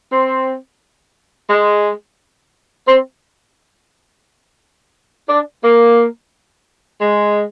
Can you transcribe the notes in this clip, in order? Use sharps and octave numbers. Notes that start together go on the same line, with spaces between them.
C4
G#3
C4
D4
A#3
G#3